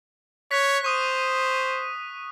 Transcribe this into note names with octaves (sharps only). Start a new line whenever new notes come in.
C#5 F#6 B6
C5 C#6 D#6 D#7